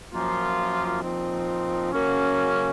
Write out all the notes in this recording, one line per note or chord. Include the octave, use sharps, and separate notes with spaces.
F#2 F3 A#3 F4
A#2 F3 C4 D#4
C#3 F#3 A#3 C#4